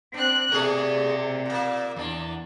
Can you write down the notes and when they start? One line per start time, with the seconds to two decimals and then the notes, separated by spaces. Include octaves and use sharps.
0.14 C4 D4 F#6
0.52 C3 A3 G#4 A#4 D5
1.46 A#2 A#3
1.96 E2 A#3 D4